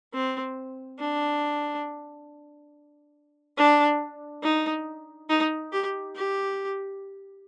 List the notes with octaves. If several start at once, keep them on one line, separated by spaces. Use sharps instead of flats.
C4
D4
D4
D#4
D#4
G4
G4